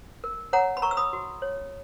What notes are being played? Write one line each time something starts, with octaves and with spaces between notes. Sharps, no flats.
A#4
C#5 F#5 A#5
B5
A#4 A#5 C#6
E6
B5 D#6
F#4
C#5